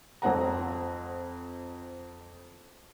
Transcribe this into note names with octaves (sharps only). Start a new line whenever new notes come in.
F2 C4 F#5 A#5